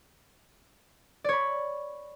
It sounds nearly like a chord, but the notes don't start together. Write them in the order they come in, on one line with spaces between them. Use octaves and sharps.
D5 C#5 B5